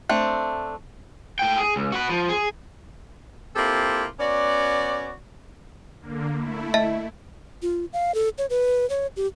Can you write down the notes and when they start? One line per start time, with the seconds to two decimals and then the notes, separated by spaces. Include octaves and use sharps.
0.09 A3 C4 D4
1.39 A2 G5
1.57 G#4
1.76 C#2
1.92 F#4 B4
2.09 F3
2.29 G#4
3.56 A#3 C4 E4 F4 G4 A4
4.20 B3 C#4 F#4 D5
6.01 D3 A#3
6.36 A3 E4
6.74 D#5 E5 A5
7.62 F4
7.93 F5
8.14 A4
8.38 C#5
8.50 B4
8.90 C#5
9.16 G4